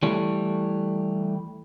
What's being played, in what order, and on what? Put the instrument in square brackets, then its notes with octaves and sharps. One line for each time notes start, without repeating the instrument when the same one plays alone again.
[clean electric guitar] E3 G3 A3